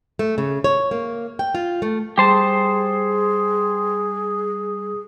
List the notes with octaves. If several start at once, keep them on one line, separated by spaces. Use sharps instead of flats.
A3
C#3
C#5
A#3
G5
F4
A3
G3 G4 G#4 C5 A5